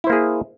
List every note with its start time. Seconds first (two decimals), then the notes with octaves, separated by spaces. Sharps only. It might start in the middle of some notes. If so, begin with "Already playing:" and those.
0.04 E4
0.07 C5
0.10 A#3
0.12 G#4